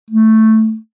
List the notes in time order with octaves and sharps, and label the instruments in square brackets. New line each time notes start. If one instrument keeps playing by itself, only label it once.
[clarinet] A3